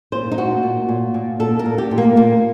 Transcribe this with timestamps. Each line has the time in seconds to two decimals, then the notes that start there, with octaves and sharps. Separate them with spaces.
0.12 A#2 C5
0.32 D#4
0.37 A#2 F#4
0.63 A#2
0.89 A#2
1.14 A#2
1.40 A#2 A4
1.59 A#4
1.65 A#2
1.78 G4
1.91 A#2
1.98 A#3
2.16 A#2 A#3